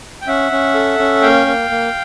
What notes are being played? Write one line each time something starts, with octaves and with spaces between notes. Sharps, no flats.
G5
C#4 E5 F#5
C#4
A4
C#4
A#3 F5 G5
A#3
A#3